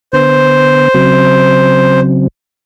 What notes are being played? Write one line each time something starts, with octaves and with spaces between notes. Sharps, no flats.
D3 B3 C5
C#3 F#3 C4